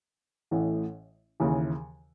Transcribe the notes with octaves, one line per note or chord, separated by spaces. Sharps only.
A1 A2 E3
D#2 C#3 E3